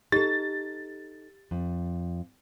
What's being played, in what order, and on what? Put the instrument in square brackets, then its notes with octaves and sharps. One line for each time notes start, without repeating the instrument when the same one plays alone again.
[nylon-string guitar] D#4 A4 [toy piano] G4 [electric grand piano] A6
[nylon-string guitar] F2